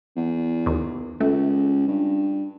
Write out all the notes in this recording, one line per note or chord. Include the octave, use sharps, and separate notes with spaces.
E2
D#2
C#2 A3
G2